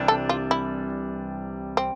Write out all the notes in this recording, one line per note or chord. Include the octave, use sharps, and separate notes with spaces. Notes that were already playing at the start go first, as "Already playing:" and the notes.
Already playing: C2 C3 E3 G3 D4
A4
F4
E4
C4